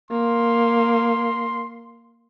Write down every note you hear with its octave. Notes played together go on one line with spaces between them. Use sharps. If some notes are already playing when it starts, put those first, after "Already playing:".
A#3 C6